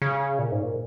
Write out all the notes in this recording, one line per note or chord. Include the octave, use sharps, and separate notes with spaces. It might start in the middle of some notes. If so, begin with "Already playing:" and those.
C#3
A#2
G#2
A#2